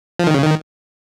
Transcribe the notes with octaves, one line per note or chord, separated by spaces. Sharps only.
F3
D#3
C#3
D#3